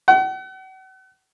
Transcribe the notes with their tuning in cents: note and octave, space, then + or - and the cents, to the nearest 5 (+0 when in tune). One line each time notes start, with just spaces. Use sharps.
F#5 +40